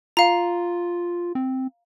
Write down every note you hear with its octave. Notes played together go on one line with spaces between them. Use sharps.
F4 F5 A#5
C4